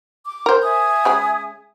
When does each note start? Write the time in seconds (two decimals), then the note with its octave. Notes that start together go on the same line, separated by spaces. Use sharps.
0.25 D6
0.46 A#4 C5
0.62 E5 G#5 D#6
1.05 C#3 G#3 G#4